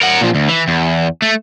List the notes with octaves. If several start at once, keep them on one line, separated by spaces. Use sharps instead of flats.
A#4 F#5
A#2 F3
D2
E3
E2
A3